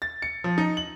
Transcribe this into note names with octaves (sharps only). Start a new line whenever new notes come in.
A6
C#7
F3
D#4
F#7